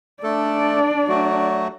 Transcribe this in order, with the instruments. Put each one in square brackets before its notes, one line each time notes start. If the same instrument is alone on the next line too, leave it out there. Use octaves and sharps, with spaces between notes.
[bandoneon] A3 A4 [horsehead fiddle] D4 D5
[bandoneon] F#3 A3 F#4